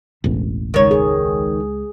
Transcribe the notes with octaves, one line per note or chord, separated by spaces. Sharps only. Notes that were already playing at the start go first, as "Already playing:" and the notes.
E1 A1 A3
C#2 D#3 G#3 C#5
G#4